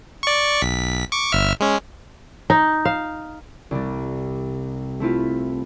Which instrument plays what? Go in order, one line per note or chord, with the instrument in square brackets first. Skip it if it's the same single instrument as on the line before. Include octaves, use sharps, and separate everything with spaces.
[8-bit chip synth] D5 C#6
B1 B6
C#6 D6
G1 E5 F6
G#3 C#4
[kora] D#4
F5
[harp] C2 G3
A3 C4 E4 F4